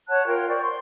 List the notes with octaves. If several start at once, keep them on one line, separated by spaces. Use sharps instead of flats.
C#5 F#5 A5 F#6
F4 A#4 G5
C5 D5 C#6
C6